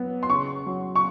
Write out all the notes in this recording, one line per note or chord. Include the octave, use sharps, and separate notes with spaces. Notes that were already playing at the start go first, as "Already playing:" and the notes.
Already playing: F#3 B3
C6
C#3 C#6
F#3
C#6